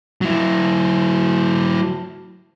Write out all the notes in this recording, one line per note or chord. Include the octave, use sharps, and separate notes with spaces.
F#3 E4